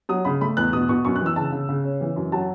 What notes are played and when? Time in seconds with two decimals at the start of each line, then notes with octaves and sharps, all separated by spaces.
0.09 F#3 D#6
0.25 C#3 B5
0.41 A3 B5
0.57 E2 F#6
0.73 B2 D#6
0.89 B2 C#6
1.05 F#2 C#6
1.16 F#6
1.21 E3 E6
1.36 C#3 A5
1.52 C#3
1.69 C#3
1.84 C#4
2.01 E3
2.16 F#2
2.32 F#3 A5